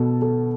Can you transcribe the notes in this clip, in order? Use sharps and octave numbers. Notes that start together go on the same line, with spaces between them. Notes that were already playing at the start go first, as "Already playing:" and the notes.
Already playing: B2 A4
A4